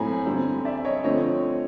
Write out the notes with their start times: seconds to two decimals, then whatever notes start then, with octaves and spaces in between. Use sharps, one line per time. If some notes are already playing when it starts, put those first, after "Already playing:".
Already playing: A2 F#3 A3 C4 G#5 A#5 B5
0.26 D3 G3 C4
0.65 D5 E5
0.84 C#5 D#5
1.04 D3 F3 A3 C4 C#5 D#5